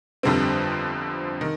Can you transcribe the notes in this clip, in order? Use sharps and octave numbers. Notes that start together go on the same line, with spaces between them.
G1 F2 D3 G3 C4
D#3